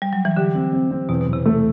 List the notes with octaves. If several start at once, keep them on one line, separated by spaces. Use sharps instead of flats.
G3
F#3
E3
D3 G4
C4
C4
C4
E2 B2
B2
E2
C3
C3 A3